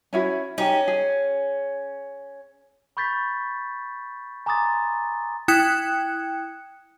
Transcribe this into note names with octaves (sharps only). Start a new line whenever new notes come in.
C#4 E4 F#4
C#4 D#4 G4
G#4
B5 C#6 G6 A6 B6
G#5 A#5 C6 D6 D#6 A6
E4 G5 D#6 F#6 G#6 C#7